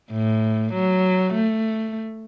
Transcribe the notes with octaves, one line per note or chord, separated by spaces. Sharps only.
A2
F#3
A3